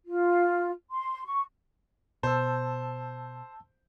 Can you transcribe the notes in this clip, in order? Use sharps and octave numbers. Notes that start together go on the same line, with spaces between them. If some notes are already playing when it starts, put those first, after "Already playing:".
F4
C6
C#6
B2 C5 A5 E6